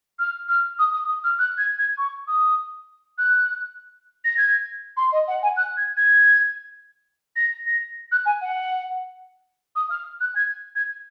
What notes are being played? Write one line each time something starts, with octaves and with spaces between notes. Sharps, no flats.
F6
F6
D#6
D#6
D#6
F6
F#6
G#6
G#6
C#6
D#6
F#6
A#6
G#6
C6
D#5
F#5
G#5
F#6
G#6
G#6
A#6
A#6
F#6
G#5
F#5
D#6
F6
F#6
G#6
G#6